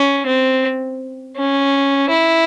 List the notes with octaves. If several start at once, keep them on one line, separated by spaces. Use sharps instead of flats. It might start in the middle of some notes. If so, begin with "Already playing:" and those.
Already playing: C#4
C4
C#4
E4